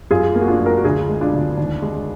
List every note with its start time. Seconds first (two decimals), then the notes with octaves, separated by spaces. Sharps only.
0.11 F#2 F4 G#4
0.35 A#3
0.41 F#4
0.48 D4 F4
0.59 F#2
0.65 F#4 A#4
0.77 F#4
0.84 D2 F4 G#4
1.09 G#3
1.21 D4 F4
1.34 D2
1.58 D#2
1.82 G#3